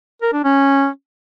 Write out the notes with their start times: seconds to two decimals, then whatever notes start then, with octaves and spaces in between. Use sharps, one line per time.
0.22 A#4
0.33 D4
0.44 C#4